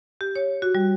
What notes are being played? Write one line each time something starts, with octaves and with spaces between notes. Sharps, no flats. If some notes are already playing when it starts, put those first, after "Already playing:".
G4
C#5
F#4
G3